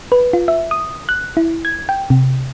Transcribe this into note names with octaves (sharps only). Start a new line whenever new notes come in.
B4
F4
E5
D#6
F#6
E4
G#6
G5
C3